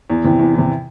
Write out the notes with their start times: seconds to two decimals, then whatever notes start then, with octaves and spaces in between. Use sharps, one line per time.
0.10 E2
0.25 C3 E3
0.39 E2
0.54 C3 E3